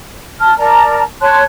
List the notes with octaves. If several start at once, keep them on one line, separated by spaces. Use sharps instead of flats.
A5 F6
A#4 D5 A5 A#5
C#5 A5 C6 F#6